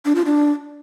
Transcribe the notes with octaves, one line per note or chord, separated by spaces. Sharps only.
D4
F4
D4